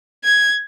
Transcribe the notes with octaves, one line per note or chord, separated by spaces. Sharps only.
G#6